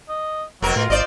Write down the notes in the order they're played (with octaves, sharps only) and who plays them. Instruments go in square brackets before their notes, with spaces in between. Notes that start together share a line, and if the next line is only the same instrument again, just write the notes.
[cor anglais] D#5
[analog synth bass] F1 [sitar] B2 A#4 [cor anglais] F#3
[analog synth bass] A2 [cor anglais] F4
[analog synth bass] G#1 [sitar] C5 D5 D#5